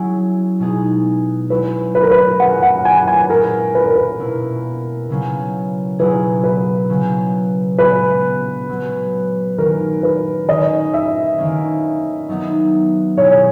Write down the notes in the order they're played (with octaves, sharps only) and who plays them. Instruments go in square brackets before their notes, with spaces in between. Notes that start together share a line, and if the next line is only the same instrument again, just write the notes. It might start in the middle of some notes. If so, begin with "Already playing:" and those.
Already playing: [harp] F#3 C#4 E4 G#4
B2 G#3 B3 D#4 G#4
[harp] F#3 C#4 E4 [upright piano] B4
[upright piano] B4
A#4
B4
[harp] F#3 C#4 G#4 [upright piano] F#5
[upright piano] F#5
G#5
G#5
[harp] A#2 G#3 C#4 E4 G#4 [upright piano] A#4
[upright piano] B4
A#4
B4
[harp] B2 A#3 E4
C#3 F#3 A#3 C#4
[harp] B2 F#3 A#3 E4 G#4 [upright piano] B4
[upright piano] B4
[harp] C#3 F#3 A#3 C#4
[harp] A#2 G#3 B3 F#4 [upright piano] B4
[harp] F#3 C#4 F#4
[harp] D#3 A#3 C#4 [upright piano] A#4
[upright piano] B4
[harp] D#3 A#3 C#4 [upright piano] D#5
[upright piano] E5
[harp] D#3 A#3 C#4
F#3 B3 D#4
[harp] B2 G#3 B3 E4 G#4 [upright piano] C#5